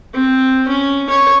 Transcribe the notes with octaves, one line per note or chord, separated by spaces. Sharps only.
C4
C#4
C#5